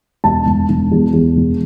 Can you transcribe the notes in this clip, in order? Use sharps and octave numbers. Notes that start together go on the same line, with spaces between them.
E1 A5
E1
E1
E2
E2
E1